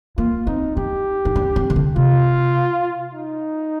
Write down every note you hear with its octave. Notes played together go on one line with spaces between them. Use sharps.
A#3 F4
C4 D#4
D#4 G4
D#4
D4
C4
D#3
D3
C3 F4
D#4